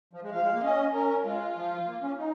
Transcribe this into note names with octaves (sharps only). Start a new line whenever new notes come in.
F3
G#3
F3 F5
G#3
A#3
C#4 D#5
C#4 A#4
G#3 F4
F3
A#3
C#4
D#4